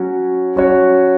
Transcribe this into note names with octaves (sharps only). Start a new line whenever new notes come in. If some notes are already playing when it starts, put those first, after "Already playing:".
Already playing: F#3 C#4 F#4 C#5
F#3 C#4 F#4 C#5